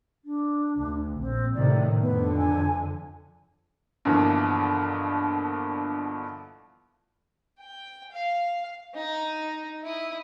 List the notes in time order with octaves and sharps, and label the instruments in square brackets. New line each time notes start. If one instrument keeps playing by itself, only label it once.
[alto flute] D4
[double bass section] D2
[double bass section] A#1 [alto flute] C4
[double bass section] A2 C3 D#3 [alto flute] D5
[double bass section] F2 D3 [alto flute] B3
[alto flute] G#5
[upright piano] G2 B2 D3 E3 F3 A#3
[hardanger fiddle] G5
F5
D#4
E4 D#6